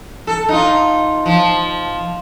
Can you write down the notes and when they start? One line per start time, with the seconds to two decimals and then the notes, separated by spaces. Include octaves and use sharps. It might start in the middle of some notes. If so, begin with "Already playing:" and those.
0.27 A4
0.49 D#4 F4
1.26 F3